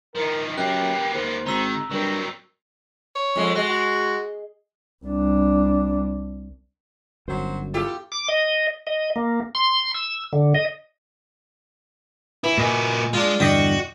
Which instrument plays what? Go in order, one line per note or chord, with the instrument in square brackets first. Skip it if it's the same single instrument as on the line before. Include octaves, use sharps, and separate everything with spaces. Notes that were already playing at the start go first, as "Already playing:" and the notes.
[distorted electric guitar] D#3 F3 [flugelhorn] A#4
[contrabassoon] F#2 [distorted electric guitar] A#3 B3 [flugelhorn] G4 [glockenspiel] F#6
[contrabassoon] D#2 [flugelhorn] C5
[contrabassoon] G#1 [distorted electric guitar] D#3 [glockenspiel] A#5 E6 B6
[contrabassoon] G2 [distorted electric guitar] F#3 C4 [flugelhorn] A#4
[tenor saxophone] C#5
[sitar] F2 G#3
[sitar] G#3 [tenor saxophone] F#4
[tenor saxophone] F#4
[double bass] C2 D4
[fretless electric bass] G1 F#2 [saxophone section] F#3 C5
[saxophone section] E2 A4 [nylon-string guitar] F4 [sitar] G4
[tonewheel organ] D6
D#5
D#5
A#3
C6
E6
D3
D#5
[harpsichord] E3 [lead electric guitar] E4
[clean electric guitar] A#2 D#5 G#5 [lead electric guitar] A#3 F#4
[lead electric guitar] G#3 [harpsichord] D4 F4
[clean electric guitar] E2 G2 D3 [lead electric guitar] F#4 [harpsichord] D5 D#5 G5